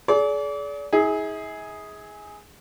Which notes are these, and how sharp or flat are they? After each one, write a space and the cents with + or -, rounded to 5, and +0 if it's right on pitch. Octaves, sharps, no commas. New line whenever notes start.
G#4 +35 D5 -35
E4 -45 G#4 +0